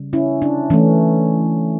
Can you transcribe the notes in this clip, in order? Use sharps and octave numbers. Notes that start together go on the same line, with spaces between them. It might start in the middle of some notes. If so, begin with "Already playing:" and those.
Already playing: C#3 G3
C#4 E4
D4
E3 A3 C#4